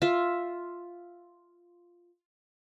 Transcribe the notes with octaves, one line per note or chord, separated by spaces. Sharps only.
F4 E5